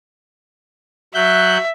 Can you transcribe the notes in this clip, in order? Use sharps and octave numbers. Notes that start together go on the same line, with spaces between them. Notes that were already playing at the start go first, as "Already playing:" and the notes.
F#3 E5 F#6 G6